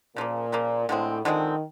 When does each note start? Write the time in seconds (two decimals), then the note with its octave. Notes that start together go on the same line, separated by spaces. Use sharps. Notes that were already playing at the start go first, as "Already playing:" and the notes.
0.16 A#2 C#3 F3 A#3
0.52 C#3 F3 A#3
0.88 A2 D3 F3 G#3 C4
1.25 D3 D#3 F3 G#3 C4